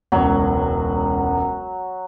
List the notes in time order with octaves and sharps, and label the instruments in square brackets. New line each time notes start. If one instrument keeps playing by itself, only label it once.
[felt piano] E1 C#2 [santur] F#3